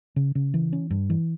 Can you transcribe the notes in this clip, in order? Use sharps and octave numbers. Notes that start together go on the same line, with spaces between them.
C#3
C#3
E3
C#4
G2
E3